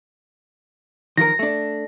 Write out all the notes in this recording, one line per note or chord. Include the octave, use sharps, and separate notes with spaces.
D#3 F3 A#4 A#6
A3 D4